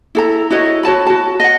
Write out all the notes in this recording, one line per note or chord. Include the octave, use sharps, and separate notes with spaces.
E4 A4 A#5
E4 F#4 C#5 D#5
F#4 C#5 A5 B5
F#4 A5
D#5 F#5